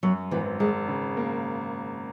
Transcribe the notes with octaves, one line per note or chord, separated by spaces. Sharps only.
F#2 F#3
G#1 E3
G#1 G#3
C#3
A#3